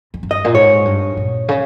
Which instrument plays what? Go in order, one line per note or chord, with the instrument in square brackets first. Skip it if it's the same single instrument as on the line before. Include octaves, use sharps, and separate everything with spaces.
[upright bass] E2
G2
[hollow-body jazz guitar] D#5
[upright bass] A#2
[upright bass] G#2 [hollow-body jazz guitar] C#5
[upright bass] G2
A#2
C#3